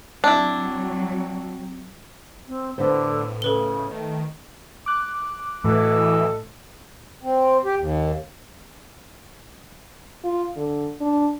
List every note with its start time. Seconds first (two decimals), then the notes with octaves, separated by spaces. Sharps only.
0.24 F#3 C4 D4 E4
2.48 C4
2.78 A2 D3 B3 C5
3.42 C#3 A4 B4 G7
3.91 D#3 A3
4.86 D6 F#6
5.64 A2 E3 F#4 A4 D#5
7.23 C4
7.64 G4
7.78 D#2
10.24 F4
10.57 D3
11.01 D4